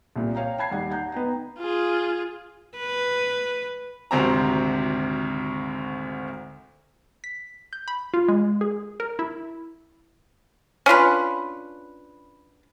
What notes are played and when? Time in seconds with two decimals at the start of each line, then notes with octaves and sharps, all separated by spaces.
0.16 C2 A#2
0.35 C#5 F5 G5 A#5
0.58 G5 A5 B5 G#6 C7
0.71 D#2 G3 F#5
0.91 F#5 A#5 G6
1.12 B3 D#4 G5 A#5
1.59 F4 G#4
2.77 B4
4.11 G#1 D2 C3 C4 A#5
7.24 B6
7.73 G6
7.88 B5
8.14 F4
8.28 G#3
8.61 G#4
9.00 A#4
9.19 E4
10.86 C#4 D4 F4 B4